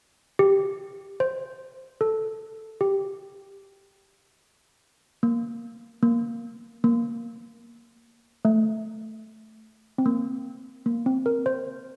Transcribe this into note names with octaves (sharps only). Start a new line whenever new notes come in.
G4
C5
A4
G4
A#3
A#3
A#3
A3
C4
A#3
A#3
C4
A#4
C5